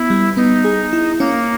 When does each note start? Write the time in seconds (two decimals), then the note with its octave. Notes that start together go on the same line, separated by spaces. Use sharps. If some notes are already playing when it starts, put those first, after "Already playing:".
Already playing: B3 E4
0.10 G3
0.37 B3 D#4
0.64 G#4
0.93 E4
1.20 A#3 C#4